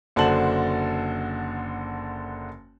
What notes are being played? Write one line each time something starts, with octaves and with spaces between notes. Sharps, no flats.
F#1 D3 F#4 C5 A5 F#7